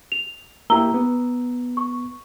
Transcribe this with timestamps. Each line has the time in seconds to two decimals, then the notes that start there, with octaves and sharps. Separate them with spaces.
0.12 F7
0.70 A#3 E4 G4 A#5 E6 G7
0.94 B3
1.77 C#6